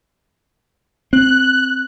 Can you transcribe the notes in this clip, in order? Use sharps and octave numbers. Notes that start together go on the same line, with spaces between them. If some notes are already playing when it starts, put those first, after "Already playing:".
C4 F#6